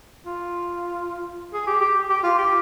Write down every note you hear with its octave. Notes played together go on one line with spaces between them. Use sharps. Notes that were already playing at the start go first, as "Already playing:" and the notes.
F4
G#4
G4
G4
G4
F4
G4